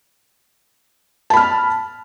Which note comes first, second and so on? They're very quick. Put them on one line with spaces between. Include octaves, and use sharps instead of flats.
A5 B5 F6